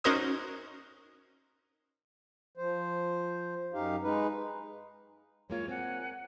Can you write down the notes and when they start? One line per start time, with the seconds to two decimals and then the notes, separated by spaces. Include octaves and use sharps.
0.04 C#4 D#4 F#4 A#4 C5 D#6
2.57 F3 C5
3.73 F#2 D#4 G4 F5
4.03 G#3 D#4 B4
5.50 G#3 A#3 F4 C#5
5.68 A#3 C4 F#5 G#5